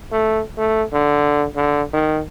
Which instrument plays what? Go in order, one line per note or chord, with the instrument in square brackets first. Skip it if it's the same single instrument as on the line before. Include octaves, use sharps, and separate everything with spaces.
[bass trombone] A3
A3
D3
D3
D#3